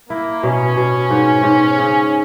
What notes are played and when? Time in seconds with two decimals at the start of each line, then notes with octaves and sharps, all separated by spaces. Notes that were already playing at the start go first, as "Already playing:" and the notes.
0.09 A#3 E4
0.43 B2 C#4
0.77 B2
1.10 G#2
1.43 G#2
1.78 C#3